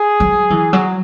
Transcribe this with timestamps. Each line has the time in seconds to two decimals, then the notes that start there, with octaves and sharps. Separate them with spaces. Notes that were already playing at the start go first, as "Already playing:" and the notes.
Already playing: G#4
0.20 F#3
0.50 E3
0.73 F#3